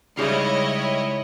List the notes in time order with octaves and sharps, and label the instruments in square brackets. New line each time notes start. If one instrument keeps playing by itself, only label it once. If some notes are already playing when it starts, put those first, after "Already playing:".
[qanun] C#3 D#4 F5 [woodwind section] G3 G#3 [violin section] E4 C#5 D#5